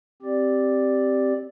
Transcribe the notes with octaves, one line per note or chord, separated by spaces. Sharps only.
C4 G4 D5